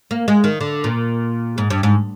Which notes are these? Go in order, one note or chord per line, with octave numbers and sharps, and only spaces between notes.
A#3
G#3
D#3
D3
A#2
G#2
G2
G#2